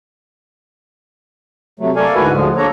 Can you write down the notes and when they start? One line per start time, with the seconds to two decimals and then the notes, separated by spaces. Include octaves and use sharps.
1.80 C3 F#3 A3
1.96 A3 A#3 A4 D5 F5 G#5
2.15 D2 G#2 E4 F#4 B4 G#5
2.33 D2 D3 F3 G#3
2.57 A#3 D4 A4 C#5 A#5